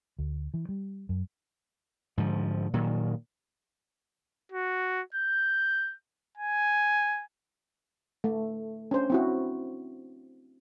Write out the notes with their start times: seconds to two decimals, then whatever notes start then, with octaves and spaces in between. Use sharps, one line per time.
0.19 D2
0.54 E3
0.69 G3
1.09 F#2
2.17 G#2 D3 F3
2.73 A#2 D#3 F#3
4.52 F#4
5.14 G6
6.38 G#5
8.24 A3
8.91 C#4 D4 C5
9.10 C4 E4 F#4